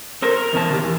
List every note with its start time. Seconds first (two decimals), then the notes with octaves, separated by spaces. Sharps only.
0.22 A4 A#4 C5
0.36 A#4
0.53 E2 B2 A5
0.69 D3 D#3 G4
0.83 E2